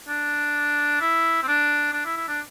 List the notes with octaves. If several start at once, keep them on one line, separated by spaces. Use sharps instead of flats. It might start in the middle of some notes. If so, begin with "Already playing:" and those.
D4
E4
C4
D4
D4
E4
E4
D4